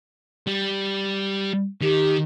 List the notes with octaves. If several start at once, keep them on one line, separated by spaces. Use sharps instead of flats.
G3
D#3 G4